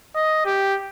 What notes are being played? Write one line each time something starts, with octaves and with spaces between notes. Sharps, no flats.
D#5
G4